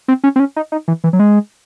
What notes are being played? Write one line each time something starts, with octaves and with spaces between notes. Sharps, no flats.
C4
C#4
C4
C#4
D#4
D#4
E3
E3
F#3
G#3